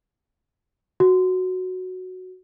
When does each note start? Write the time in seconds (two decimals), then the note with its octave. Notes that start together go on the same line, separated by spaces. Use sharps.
1.00 F#4